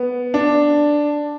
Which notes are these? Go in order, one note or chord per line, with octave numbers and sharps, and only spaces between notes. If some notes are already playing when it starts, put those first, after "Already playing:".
Already playing: B3
D4